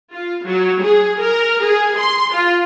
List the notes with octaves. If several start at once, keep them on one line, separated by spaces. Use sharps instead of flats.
F4
F#3
G#4
A#4
G#4
C6
F4